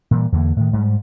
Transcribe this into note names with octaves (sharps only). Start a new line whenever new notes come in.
A#2 E3 G3
E2 D3 G#3 A#3
A2 D#3
G#2 G3